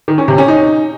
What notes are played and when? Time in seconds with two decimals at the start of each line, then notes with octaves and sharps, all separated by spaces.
0.08 D#3
0.18 C#4
0.28 C3
0.38 C#4
0.48 D#4